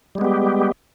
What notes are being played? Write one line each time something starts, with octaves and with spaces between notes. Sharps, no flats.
G3 G#3 B3 G4